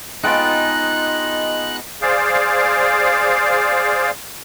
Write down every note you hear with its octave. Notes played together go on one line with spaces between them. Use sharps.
G#3 B3 D#4 F4 G5 F#6
G#4 C5 D5 F5